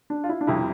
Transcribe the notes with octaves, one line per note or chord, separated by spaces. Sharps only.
D4
F4
E4
D4
F1 F2 C3 G3 E4